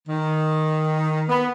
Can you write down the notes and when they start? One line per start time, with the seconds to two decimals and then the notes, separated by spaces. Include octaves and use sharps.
0.08 D#3
1.29 B3